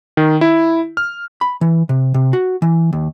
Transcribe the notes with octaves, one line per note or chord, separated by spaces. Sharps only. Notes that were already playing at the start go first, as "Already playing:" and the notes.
D#3
E4
F6
B5
E3
C3
C3
F#4
E3
D#2